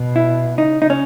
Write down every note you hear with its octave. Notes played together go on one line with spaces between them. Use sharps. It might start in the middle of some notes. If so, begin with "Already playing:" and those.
Already playing: B2
E4
C#3 D#4
D#4
C#4